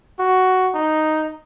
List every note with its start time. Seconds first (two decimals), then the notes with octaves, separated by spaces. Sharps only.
0.19 F#4
0.74 D#4